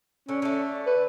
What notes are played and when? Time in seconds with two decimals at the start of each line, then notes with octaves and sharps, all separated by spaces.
0.29 D3 C#4
0.42 D3 A3
0.87 B4